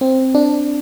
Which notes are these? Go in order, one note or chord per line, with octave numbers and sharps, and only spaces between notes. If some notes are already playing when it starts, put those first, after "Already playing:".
C4
D4